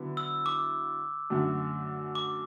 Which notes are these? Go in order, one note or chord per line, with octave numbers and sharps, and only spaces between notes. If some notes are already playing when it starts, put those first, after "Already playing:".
Already playing: D3 F#3 B3 E4
E6
D6
F#2 D3 A3 F#4
D6